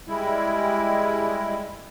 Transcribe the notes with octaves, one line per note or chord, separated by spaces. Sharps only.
G3 G#3 E4